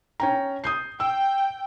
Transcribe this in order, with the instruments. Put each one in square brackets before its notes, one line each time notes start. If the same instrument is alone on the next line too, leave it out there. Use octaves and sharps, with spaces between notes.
[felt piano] C#4 G5 A#5
D#6 G6 C7
[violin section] G5 [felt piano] E6